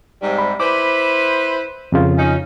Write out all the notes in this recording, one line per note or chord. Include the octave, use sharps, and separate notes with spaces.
G#2 C3 G3
B5
E4 B4 C5 D6
F2 C#3 F4
C#4 D#4